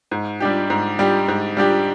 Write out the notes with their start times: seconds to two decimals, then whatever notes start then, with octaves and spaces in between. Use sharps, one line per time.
0.11 G#2
0.40 G3 D4 G4
0.70 G#2
0.99 G3 D4 G4
1.28 G#2
1.57 G3 D4 G4